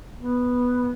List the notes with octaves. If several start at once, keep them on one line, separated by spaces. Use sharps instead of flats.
B3